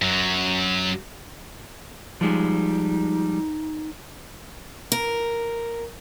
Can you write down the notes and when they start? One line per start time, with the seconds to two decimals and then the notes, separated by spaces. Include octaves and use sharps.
0.02 F#2 F#3
2.21 F3 G3 G#3 D#4
4.92 A#4